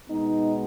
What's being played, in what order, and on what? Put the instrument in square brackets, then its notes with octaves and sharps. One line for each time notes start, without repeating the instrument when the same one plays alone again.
[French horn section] B2 G#3 B3 D#4